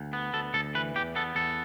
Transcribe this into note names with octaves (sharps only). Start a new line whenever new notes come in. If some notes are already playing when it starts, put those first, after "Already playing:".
Already playing: D2
B3
D2 A4
D2 A4
E3 B4
E2 G4
B3 A4
E2 A4